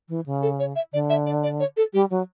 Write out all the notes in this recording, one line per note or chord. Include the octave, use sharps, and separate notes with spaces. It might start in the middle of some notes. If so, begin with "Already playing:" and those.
E3
C#3
A4
C#5
E5
D3 D5
E5
D5
D5
C#5
A4
G3 G4
F#3